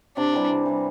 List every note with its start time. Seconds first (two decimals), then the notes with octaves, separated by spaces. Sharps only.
0.17 C3 D4
0.33 E3 G3
0.49 C3
0.66 E3 G3